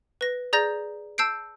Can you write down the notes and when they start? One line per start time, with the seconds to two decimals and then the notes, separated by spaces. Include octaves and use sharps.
0.21 B4 A#6
0.53 G#4 D5 A#5 G6 A#6
1.18 A5 E6 G6 C7 D7